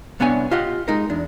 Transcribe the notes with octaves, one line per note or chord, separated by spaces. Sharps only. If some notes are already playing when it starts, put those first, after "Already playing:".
C2 B3 D4 C#5 G#5
F4 G4 D#5 F#5
G#3 D#4 A#4
E2 D4